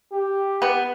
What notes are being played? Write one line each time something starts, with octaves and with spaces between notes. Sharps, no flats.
G4
B3